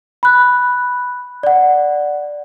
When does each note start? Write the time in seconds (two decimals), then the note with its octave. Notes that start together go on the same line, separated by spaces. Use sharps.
0.23 B5 F#6
1.43 D5 F#5